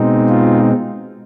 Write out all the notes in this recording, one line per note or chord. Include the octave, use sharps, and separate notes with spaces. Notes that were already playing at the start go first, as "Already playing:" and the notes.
Already playing: B2 G#3 C4 D#4
F4